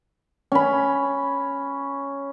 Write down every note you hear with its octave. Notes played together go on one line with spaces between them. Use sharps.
C#4 B5